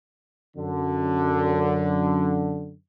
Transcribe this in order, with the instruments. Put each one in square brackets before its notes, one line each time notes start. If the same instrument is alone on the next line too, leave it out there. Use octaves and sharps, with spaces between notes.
[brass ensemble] F#2 D3